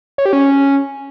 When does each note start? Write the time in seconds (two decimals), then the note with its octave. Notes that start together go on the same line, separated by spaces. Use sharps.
0.18 C#5
0.26 G4
0.33 C#4